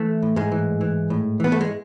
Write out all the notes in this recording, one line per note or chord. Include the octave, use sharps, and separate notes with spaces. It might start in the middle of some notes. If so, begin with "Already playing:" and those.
Already playing: E3 A3
A2
G#2 G#3
E3
E3
A2
E3 B3
A3
G#3